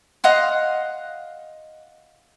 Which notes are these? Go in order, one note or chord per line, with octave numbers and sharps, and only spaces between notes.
D#5 F5 F#5 C6